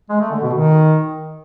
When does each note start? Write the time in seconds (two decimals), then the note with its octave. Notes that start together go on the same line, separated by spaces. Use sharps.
0.09 G#3
0.20 A3
0.31 D3
0.42 B2
0.53 D#3